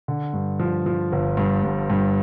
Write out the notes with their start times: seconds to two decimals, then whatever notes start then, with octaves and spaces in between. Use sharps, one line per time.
0.08 D3
0.33 G2
0.60 F3
0.86 F3
1.12 G1
1.37 G2
1.64 G2
1.90 G2